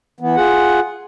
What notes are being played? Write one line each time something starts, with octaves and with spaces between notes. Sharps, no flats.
E3 B3
F4 G#4 F#5